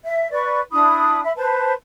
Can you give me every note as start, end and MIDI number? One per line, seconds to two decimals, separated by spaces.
0.04 0.29 76
0.31 0.60 71
0.31 0.60 74
0.31 0.60 85
0.71 1.20 62
0.71 1.20 64
0.71 1.20 83
0.71 1.20 87
1.23 1.31 76
1.23 1.31 83
1.36 1.72 71
1.36 1.72 72
1.36 1.72 81